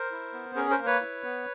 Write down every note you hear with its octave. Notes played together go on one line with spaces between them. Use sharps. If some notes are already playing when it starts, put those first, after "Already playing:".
Already playing: A#4 C5
E4
B3
C#4 G#4 A#4
A#4 C5
A#3
B4 C#5
E4
B3